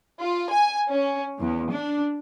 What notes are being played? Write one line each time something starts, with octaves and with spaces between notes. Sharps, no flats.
F4
G#5
C#4
E2
D4